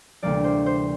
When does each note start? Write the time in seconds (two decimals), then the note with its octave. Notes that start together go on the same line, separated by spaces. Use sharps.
0.23 D2 C3 E3 G3 A#3 D5
0.44 C5
0.66 C5